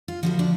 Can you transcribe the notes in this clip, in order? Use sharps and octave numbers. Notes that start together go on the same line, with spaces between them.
F4
D2 D3 F3 F#4
D4